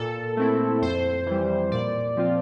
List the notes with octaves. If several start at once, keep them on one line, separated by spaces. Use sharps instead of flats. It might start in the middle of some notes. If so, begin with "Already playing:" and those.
Already playing: A#2 A4
A3 C4 E4
F2 C5
E3 G3
A#2 D5
F3 C4 F4